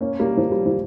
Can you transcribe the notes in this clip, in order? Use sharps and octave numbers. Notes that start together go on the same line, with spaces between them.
A#3 C#4
G3 A#3
F3
G3
F3